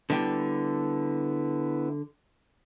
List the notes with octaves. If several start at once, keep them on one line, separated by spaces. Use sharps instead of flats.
D3 G3 B3 E4 G5